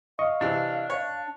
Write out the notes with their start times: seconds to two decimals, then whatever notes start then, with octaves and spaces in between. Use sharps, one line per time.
0.19 D#5 F5 C#6
0.41 C3 E3 D4
0.90 C#5